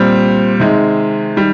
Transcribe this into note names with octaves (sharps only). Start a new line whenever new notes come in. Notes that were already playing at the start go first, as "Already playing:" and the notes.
Already playing: A#2 G3 C4
C3 D#3 G#3
D#3 G3